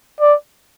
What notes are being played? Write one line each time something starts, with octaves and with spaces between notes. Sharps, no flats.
D5